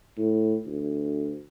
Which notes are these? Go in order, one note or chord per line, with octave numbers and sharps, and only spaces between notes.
A2
D2